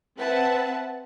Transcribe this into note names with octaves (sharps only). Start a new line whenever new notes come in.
C4 B4 E5 F#5 A5